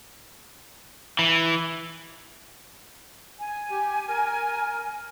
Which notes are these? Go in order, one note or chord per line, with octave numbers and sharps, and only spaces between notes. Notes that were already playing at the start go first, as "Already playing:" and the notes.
E3
G#5
G4
A#4